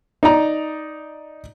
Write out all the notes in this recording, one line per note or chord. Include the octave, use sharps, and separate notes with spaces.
D#4 D5 A#5